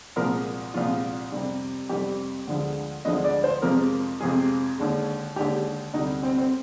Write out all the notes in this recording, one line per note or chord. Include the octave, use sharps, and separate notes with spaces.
C2 A#2 F3 G#3 A#4
C2 A#2 F3 G#3 F4
F2 C3 G3
F2 C3 G3 G4
D2 D3 F3 G#3
D2 D3 F3 G#3 D#5
D5
C5
F2 C3 F3 G#3 A#4
F2 C3 F3 G#3 G#4
D#2 D3 G#3
D#2 D3 G#3 G4
D2 C3 G3 D#4
C4
C4